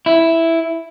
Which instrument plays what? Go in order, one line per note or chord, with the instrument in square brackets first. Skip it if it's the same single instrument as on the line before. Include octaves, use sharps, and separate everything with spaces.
[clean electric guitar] E4